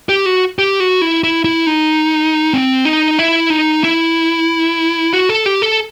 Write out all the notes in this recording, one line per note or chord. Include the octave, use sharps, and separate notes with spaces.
G4
F#4
G4
F#4
E4
E4
E4
D#4
C4
D#4
E4
D#4
E4
F#4
A4
G4
A4